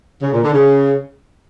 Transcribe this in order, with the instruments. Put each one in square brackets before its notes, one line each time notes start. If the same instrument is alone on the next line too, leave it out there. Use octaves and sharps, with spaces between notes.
[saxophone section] C#3
A#2
D3
C#3